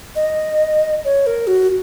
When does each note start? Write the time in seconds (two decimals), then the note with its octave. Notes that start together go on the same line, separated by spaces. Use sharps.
0.16 D#5
1.05 C#5
1.26 A#4
1.47 F#4